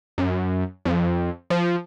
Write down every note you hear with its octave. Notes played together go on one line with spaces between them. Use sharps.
F#2
F2
F3